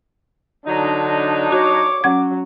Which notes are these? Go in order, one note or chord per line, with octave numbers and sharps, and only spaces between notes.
D3 F#3 D4 D#4
F#4 C#5 D6
F#3 C#4 F#5 G#6